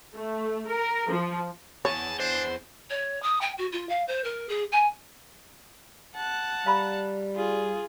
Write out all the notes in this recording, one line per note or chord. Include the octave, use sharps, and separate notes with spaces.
A3
A#4
F3
E2 G#4 C#5 A5
D4 C5
C#5
D#6
G5
F#4
F4
F5
C5
A#4
G#4
G#5
F#5 A5
G3 F5 A#5 B5
F4 G#4